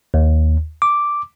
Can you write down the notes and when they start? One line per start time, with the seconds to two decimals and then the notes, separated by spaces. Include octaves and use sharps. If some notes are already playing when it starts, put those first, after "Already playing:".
0.14 D#2
0.82 D6